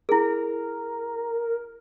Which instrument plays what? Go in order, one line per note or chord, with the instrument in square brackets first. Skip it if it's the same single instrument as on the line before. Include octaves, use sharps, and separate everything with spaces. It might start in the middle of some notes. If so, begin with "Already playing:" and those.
[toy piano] E4 G#4 [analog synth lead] A#4